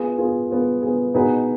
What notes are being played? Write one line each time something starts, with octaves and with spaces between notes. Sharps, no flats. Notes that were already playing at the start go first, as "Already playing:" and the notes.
Already playing: B3 F4 G#4
B3 F4 G#4
B3 F4 G#4
B3 F4 G#4
B2 B3 D#4 G#4 B4